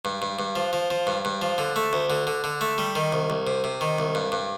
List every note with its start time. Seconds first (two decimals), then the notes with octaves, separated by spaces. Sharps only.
0.05 G2
0.22 G2
0.39 G2
0.56 F3
0.73 F3
0.90 F3
1.07 G2
1.25 G2
1.42 F3
1.58 D3
1.76 A3
1.93 D2
2.10 D3
2.27 D3
2.44 D3
2.61 A3
2.78 G3
2.95 D#3
3.13 C2
3.30 C2
3.47 C3
3.64 C3
3.81 D#3
3.99 C2
4.15 G2
4.32 G2